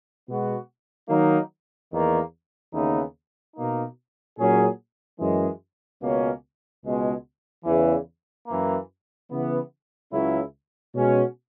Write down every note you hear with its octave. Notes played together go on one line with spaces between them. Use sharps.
B2 G#3 B3 F#4
D#3 F#3 A#3 D#4
E2 D#3 A#3
D#2 C#3 E3 B3 D#4
B2 A#3 D#4
A#2 F#3 C#4 G#4
F#2 E3 G#3
C#2 B2 A#3 C#4
C#2 B2 G#3
E2 C#3 E3
F#2 E3 A#3
C#3 E3 B3
C#2 C#3 F#3 C#4 E4
B2 G#3 C#4 F#4